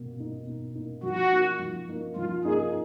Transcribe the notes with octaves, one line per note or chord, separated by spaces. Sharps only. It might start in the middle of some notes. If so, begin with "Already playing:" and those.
Already playing: B2 A#3
A#3 D#4
B2
A#3 D#4
F3 F#4
A#3 D#4
F3
A#3 D#4
F3 F4
A#3 D#4 G#4